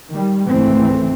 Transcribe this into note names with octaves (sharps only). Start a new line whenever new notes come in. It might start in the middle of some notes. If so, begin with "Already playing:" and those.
D#3 G3
G#1 C#2 E3 A3 C4